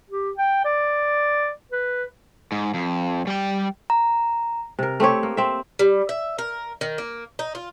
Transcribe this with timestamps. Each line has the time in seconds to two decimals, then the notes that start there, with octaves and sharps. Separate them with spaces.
0.10 G4
0.37 G5
0.65 D5
1.72 B4
2.52 G#2
2.74 F2
3.27 G3 G5
3.90 A#5
4.79 C3 A#4
5.00 A3 C4 G4 C#5
5.23 A#3
5.37 C4 E5
5.79 G3
6.09 E5
6.38 A#4
6.81 D#3
6.98 A#3
7.39 D#4
7.55 F4